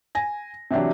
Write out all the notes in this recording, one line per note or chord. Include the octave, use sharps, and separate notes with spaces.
G#5 A#6
C3 E3 F#3 D4 G4